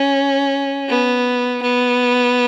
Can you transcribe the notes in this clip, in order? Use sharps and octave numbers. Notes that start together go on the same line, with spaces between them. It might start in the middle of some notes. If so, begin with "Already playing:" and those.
Already playing: C#4
B3
B3